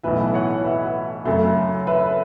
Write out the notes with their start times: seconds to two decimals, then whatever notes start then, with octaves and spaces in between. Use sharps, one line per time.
0.03 B1 A2 E3 B4 E5
0.34 C#5 F#5
0.64 B4 E5
1.25 F#2 C#3 A3
1.87 B4 E5